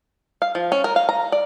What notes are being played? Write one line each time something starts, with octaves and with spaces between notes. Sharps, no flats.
F5
F3
C#4
A#4
F5
A#5
D5